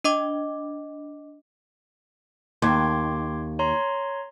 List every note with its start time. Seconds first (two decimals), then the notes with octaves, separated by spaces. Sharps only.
0.04 D4 D#5 D6
2.62 D#2 C6 D6 G#6
3.59 C#5 A#5 C6